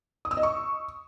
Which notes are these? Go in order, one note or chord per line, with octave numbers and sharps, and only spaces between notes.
D#6
E6
D#5
C#6